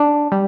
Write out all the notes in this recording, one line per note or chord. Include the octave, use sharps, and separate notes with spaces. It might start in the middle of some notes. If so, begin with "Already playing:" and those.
Already playing: D4
G3